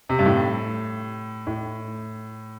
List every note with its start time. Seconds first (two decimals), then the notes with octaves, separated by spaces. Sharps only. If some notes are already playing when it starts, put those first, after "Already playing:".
0.09 C3
0.19 G2
0.26 A2
1.47 A2